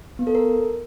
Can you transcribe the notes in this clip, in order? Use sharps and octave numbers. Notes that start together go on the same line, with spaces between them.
B3
A4
A#4